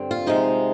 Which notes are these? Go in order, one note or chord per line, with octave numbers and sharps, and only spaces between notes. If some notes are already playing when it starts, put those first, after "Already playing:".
Already playing: G2 D3 C4
F4
C3 F3 G#3 D#4